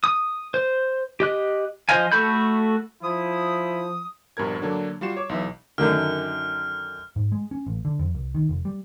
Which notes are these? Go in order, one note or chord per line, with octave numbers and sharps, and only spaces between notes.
D#6
C5
G4 D#5 F#6
F3 C5 D#5 F5 G#5
A3 F#4 A4 B5 G6
F3 E4 D#6
A#1 G2 B2 A#4 G#6
D3 F#3 A#3 D4
G3 F4 F#4 C7 E7
C#5 D6
B1 E3 E5
F#2 D3 D#3 F6
G#2
G#3
C#4
A1
D3
F2
C2
D#3
F1
G3